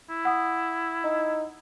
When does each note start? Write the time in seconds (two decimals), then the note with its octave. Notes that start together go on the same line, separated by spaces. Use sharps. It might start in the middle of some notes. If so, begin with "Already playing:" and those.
0.10 E4
0.25 F#5 D#6
1.04 D#4